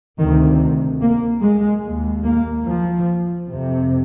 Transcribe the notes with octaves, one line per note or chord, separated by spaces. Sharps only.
D2 C3 D#3
A#3
G#3
D#2
A#3
F3
F2 C3